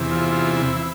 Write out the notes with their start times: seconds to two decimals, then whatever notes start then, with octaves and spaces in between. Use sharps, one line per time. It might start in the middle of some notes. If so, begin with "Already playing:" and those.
Already playing: E2 C3 E3
0.11 F4
0.32 F4
0.57 E4
0.77 E4